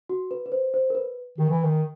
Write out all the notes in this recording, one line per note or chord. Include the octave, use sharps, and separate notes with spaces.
F#4
B4
B4
C5
C5
A#4
B4
D#3 G4
E3
D#3